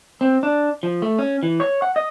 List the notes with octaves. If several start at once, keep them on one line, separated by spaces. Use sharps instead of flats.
C4
D4
F3
A3
C#4
E3
C#5
F#5
D#5